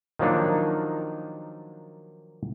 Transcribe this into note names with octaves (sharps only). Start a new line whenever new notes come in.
D#3 F3 F#3 A#3 D4 D#4